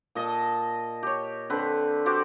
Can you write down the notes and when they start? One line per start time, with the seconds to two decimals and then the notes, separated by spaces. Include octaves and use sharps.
0.15 A#2 D#5 A5
1.03 G4 C#5
1.50 D3 C4 B4
2.06 F#4 G4 C5 D5